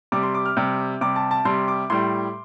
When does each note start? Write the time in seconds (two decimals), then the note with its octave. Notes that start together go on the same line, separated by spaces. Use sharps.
0.12 C3 G3 D6
0.23 C6
0.34 D6
0.46 F6
0.57 C3 G3
1.01 C3 G3 D6
1.16 A5
1.31 A5
1.45 C3 G3 C6
1.68 D6
1.90 A2 G3 C6